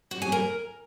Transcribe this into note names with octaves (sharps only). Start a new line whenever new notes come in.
F#4
G#5
A#4